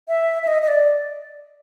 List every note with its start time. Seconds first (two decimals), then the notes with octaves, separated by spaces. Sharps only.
0.08 E5
0.42 E5
0.47 D#5
0.62 D#5
0.68 D5